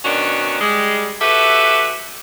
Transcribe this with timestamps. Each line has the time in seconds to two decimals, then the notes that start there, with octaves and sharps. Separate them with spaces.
0.03 B2 D#3 C#4 D4 F#4
0.60 G3 G#3
1.20 F#4 G4 A4 B4 E5